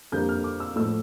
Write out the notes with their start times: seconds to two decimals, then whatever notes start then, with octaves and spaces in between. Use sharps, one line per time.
0.12 F2 D3 G3 A#3 G6
0.29 F6
0.44 D6
0.60 E6
0.76 A2 F3 A3 E6